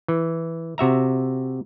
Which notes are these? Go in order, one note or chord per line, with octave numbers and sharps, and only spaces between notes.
E3
C3 F#4 E5 A#5